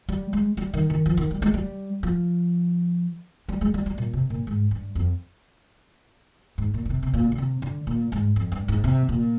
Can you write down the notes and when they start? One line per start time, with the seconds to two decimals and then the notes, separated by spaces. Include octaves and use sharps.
0.09 G3
0.33 G#3
0.57 G3
0.74 D#3
0.90 D#3
1.06 F3
1.17 D#3
1.31 G3
1.42 G#3
1.54 G3
2.03 F3
3.49 G3
3.61 G#3
3.74 G3
3.86 G3
3.98 A#2
4.13 C3
4.30 A#2
4.47 G#2
4.71 G2
4.95 F2
6.58 G#2
6.74 A#2
6.86 A#2
6.90 C3
7.03 C3
7.13 A#2
7.32 D3
7.38 C3
7.62 D3
7.87 A#2
8.12 G#2
8.36 F2
8.52 G2
8.68 G#2
8.84 C3
9.09 A#2